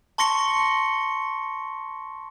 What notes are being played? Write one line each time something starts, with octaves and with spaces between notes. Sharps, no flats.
A5 C6 C#6 A#6 C#7 G7